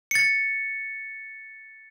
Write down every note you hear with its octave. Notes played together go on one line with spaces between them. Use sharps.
A6 C#7